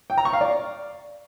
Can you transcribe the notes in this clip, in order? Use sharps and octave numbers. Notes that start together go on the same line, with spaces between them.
G5
A#5
C#6
F5
D5